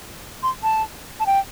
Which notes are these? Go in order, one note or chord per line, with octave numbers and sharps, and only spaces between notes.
C6
A5
A5
G5